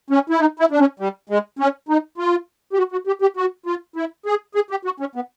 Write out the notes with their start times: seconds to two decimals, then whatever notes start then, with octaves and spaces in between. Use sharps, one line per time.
0.10 C#4
0.30 E4
0.40 D#4
0.60 E4
0.71 D4
0.80 C#4
1.00 G3
1.30 G#3
1.59 C#4
1.89 D#4
2.18 F4
2.73 G4
2.78 F#4
2.92 F#4
3.07 G4
3.22 G4
3.37 F#4
3.66 F4
3.96 E4
4.26 G#4
4.55 G#4
4.71 G4
4.85 F#4
5.00 C#4
5.15 B3